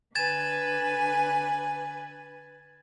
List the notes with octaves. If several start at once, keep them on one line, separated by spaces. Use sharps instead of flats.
D3 B4 G#5 G#6 A6 E7